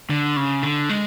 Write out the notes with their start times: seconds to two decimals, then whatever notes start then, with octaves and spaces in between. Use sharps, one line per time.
0.10 D3
0.36 C#3
0.63 D3
0.89 G#3